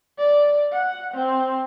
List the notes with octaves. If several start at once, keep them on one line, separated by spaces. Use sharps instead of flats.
D5
F#5
C4